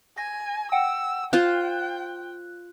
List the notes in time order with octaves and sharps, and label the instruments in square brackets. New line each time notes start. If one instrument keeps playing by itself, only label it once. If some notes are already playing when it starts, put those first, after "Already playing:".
[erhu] G#5 [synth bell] A#6
[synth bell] F#5 G5 [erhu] E6
[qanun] F4 C5 F5 [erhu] G5 [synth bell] F#6